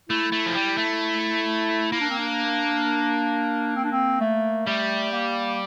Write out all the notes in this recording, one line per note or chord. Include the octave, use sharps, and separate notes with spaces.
A3 E4
A3
F3
G3
A3
A#3 E4
D4
C4
D4
C4
D4
C4
A3
G3 A3
A#3